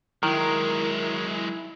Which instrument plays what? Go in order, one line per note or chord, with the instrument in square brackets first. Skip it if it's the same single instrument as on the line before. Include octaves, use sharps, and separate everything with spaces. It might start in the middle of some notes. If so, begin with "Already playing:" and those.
[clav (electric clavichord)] D#3 [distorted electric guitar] F#3 G#3 [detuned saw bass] E4 [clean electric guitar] A#4